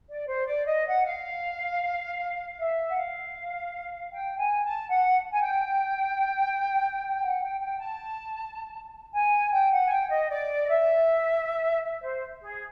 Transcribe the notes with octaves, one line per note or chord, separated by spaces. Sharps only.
D5
C5
D5
D#5
F#5
F5
E5
F#5
F5
G5
G#5
A5
F#5
G#5
G5
F#5
G5
G5
A5
G#5
G5
F#5
G#5
G5
D#5
D5
D#5
E5
E5
C5
G#4